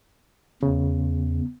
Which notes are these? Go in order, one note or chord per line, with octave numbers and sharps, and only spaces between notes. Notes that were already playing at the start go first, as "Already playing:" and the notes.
E2 C#3